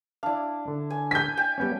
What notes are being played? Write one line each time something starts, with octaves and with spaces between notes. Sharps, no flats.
D4 E4 D5 F5
D3
G#5
G#5 G6 B6
G5 G#5
G3 B3 C#4